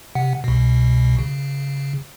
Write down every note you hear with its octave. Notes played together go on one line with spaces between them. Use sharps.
C3 F#5
C2 B2
C#3